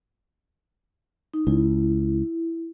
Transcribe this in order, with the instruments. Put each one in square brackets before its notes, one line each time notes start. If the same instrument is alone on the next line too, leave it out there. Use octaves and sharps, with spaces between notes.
[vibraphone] D#4
[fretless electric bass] C#2 [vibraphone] E4